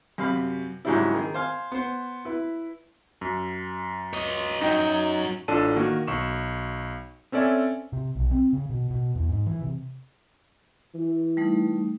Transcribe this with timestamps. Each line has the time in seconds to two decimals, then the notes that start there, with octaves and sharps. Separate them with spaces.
0.18 F#2 C3 F5 B5
0.85 G#2 C#3 F#3 G3 D4 E4
1.14 D#3 G#4
1.34 C5 F5 G#5
1.72 B3 C5
2.25 E4 B4
3.21 F#2
4.14 C#5 D#5
4.62 F#2 F#3 D#4 G5
5.48 A1 D4 F4 A4 A5 D#7
5.76 D#3 A#3 F#4 A#4
6.07 B1 C#6 E7
7.32 C4 C#4 A4 D5 E5 G#5
7.93 C3
8.15 B1
8.31 C4
8.53 C#3
8.69 B2
8.90 B2
9.15 E2
9.29 G#2
9.46 E3
9.62 C3
10.94 E3
11.37 G3 A3 D#4